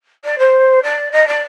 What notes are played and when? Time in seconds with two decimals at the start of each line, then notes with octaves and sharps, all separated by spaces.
0.24 D5
0.38 C5
0.83 D5
1.12 D#5
1.27 D5